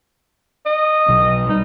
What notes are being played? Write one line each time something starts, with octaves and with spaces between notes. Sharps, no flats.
D#5
B1 B2 F#3
G3 D#4